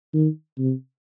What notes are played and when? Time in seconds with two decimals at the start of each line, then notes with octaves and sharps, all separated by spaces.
0.14 D#3
0.58 C3